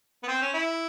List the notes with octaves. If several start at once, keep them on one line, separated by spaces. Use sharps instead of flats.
B3
C4
C#4
E4